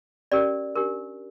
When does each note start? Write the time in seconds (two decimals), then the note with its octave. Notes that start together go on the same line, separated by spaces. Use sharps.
0.32 C#4 G4 A#4 D5
0.76 D4 G4 A#4